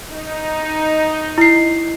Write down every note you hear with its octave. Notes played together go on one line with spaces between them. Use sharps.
D#4
E4 C7